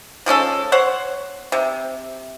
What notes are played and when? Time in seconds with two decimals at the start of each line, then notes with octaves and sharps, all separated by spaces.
0.26 F3 G#3 C#4 A4
0.72 C5 C#5 F#5
1.52 C3